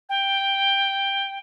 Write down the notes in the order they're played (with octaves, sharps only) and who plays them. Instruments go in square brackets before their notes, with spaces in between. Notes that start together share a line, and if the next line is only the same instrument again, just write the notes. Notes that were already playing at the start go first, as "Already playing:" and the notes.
[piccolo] G5